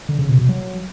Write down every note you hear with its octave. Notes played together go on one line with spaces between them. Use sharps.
D3
C#3
B2
B2
F#3